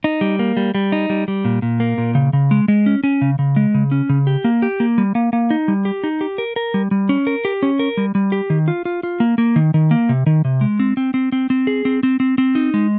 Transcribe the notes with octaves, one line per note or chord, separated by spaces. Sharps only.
D#4
G3
A#3
G3
G3
D#4
G3
G3
A#2
A#2
A#3
A#2
C#3
C#3
G#3
G#3
C#4
C#4
C#3
C#3
G#3
C#3
C#4
C#3
G4
A#3
G4
A#3
G3
A#3
A#3
D#4
G3
G4
D#4
G4
A#4
A#4
G3
G3
C#4
A#4
G4
C#4
A#4
G3
G3
G4
D#3
F4
F4
F4
A#3
A#3
D#3
D#3
A#3
C3
D#3
C3
G#3
C4
C4
C4
C4
C4
G#4
C4
C4
C4
C4
D#4
G#3